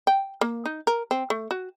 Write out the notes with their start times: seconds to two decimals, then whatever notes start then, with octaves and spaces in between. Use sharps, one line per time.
0.07 G5
0.41 A#3
0.65 D#4
0.87 A#4
1.11 C4
1.30 A3
1.51 F#4